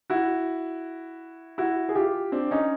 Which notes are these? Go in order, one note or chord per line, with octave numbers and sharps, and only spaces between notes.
E4 F#4
E4 F#4
G#4
F4 G4
C4 D4
C#4 D#4